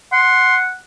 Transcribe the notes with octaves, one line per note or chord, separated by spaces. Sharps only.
F#5 C6